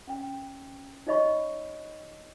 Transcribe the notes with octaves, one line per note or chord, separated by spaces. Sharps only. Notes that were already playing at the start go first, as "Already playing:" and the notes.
C#4 G5
D#4 G4 C#5 D#5 B5 C#6